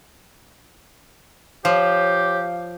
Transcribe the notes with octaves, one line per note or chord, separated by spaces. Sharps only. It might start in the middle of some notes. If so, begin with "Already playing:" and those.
F3 G4 C#5 F5